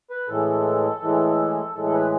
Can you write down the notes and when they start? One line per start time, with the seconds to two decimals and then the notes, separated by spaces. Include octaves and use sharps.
0.10 B4
0.28 A2 E3 G#3 A4
1.02 A2 E3 G#3
1.75 A2 E3 G#3 A4
1.85 A4
1.93 B4